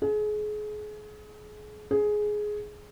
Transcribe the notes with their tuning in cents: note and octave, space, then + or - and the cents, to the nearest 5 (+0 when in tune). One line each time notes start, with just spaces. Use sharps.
G#4 +30
G#4 +10